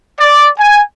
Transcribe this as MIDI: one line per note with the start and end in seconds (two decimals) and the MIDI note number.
0.19 0.48 74
0.58 0.80 80